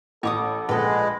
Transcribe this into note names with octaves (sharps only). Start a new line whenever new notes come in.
A1 A4 C#5 D6 D#6
A#1 G#3 A4 B4 F#5